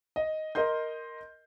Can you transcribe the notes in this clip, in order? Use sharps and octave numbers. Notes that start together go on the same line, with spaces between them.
D#5
A#4 D#5 C6 G6